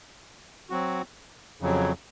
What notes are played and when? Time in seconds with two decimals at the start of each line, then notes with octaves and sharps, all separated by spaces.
0.70 F#3 C4 F#4
1.61 F2 C#3 F#3